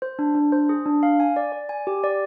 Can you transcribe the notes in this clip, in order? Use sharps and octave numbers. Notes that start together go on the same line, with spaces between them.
C5
D4
D4
C5
G#4
D4
F5
G#5
D5
D5
G#5
G4
D5